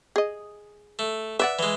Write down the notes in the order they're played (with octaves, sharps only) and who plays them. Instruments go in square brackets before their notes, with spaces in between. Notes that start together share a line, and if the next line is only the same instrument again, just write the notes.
[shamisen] G#4 D#5
[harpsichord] A3
[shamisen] B4 D5 F#5 [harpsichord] E5
[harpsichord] E3 G#3